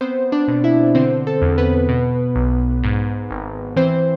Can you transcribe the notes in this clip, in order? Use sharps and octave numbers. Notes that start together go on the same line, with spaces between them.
B3 C4 C5
D4 D5
B2
E4 E5
D3 C4 C5
A4
E2
B3 B4
B2
B1
G#2
G#1
E3 C4 C5